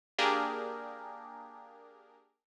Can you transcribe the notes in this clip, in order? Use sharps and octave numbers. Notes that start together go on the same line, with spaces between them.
A#3 D4 G4 G#4 A#4